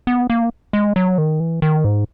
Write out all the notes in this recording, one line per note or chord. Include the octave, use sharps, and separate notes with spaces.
B3
A#3
G#3
F#3
D#3
E3
D#3
G#2